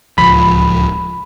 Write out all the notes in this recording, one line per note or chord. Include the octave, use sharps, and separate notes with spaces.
D1 C#2 F3 B5